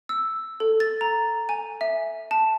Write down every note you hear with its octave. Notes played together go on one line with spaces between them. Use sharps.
E6
A4
A6
A#5
G#5
E5
A5